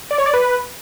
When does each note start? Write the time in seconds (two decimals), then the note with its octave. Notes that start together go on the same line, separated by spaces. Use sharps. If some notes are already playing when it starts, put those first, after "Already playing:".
0.11 D5
0.18 C#5
0.26 D5
0.34 B4